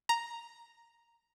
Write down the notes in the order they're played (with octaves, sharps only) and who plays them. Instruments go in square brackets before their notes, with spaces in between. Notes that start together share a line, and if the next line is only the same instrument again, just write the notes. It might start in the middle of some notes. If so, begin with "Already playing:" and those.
[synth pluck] A#5